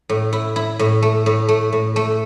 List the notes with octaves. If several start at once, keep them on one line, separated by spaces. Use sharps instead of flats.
A2
E4
E4
A2
A3
A2
A3
A2
A3